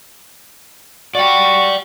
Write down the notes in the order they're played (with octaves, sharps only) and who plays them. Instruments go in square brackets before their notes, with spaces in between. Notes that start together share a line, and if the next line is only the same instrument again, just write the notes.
[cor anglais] F#4 [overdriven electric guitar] D5 G5